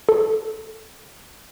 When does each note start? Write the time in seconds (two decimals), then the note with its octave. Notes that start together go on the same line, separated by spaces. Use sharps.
0.09 A4